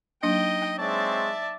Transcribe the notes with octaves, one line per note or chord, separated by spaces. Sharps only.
F#3 A#3 D4 D#4 D#5 G5
G#3 C4 C#5 D5 E5 A5